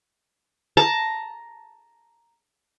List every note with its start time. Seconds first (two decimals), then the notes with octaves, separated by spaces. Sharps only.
0.77 A5 A#5